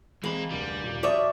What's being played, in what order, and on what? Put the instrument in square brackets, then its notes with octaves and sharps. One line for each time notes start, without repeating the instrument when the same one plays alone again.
[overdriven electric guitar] E3 B5 [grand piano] G#3 C4 [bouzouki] A#3
[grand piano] F1 D2 [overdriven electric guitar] G3
[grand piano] D#1
[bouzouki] F3 C#5 E5 [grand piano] F#4 D#6 [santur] D5